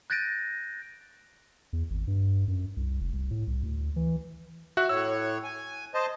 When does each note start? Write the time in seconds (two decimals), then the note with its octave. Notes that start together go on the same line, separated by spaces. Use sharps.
0.10 F#6 G6 A6 A#6 D7 D#7
1.73 E2
1.90 G#1
2.07 G2
2.48 F#2
2.77 C2
3.01 F1
3.13 C2
3.31 A2
3.47 C2
3.63 D2
3.96 E3
4.77 F#4 E5 F#6
4.89 A2 C#5 E6
5.44 G#5
5.94 C5 D#5 A5